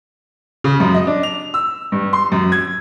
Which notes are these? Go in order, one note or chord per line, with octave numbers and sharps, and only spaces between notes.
C#3
F#2
D#5
D4
F7
E6
G2
C6
F#2
G#6